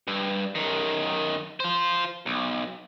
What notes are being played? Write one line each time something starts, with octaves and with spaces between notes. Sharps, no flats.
G2
F#2 D#3
F4 C5
B1